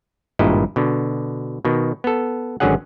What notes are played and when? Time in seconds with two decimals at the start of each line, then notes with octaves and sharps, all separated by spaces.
0.39 G#1 G2 A#2 E4 D#5
0.76 B2 D3
1.65 B2 D#3
2.04 B3 A4
2.60 G#1 D3 F#3 C#4 G#4 F#5